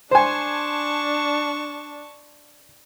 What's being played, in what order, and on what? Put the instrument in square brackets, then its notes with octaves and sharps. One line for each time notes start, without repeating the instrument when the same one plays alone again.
[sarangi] D4 [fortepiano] C5 G#5 [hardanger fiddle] A5 C#6